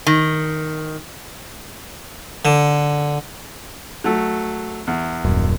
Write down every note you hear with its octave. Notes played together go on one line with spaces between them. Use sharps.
D#3
D3
F#3 A3
E2
D#1 F#2